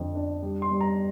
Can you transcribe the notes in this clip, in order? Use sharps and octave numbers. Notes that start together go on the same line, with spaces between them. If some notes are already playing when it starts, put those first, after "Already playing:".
Already playing: F2 D3
D4
G3
C6
G3
A#5